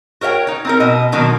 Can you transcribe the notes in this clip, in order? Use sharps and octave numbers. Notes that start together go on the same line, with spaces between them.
F#4 A#4 C#5 E5 G5
D#4 C#5
C4 D#4 A#4
B2 D#5
B2 D3 D#3 F#3 A#3